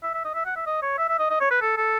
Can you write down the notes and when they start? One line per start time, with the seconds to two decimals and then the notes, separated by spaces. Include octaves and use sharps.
0.03 E5
0.14 E5
0.25 D#5
0.35 E5
0.46 F#5
0.56 E5
0.67 D#5
0.82 C#5
0.98 E5
1.09 E5
1.19 D#5
1.30 D#5
1.40 C#5
1.51 B4
1.62 A4
1.77 A4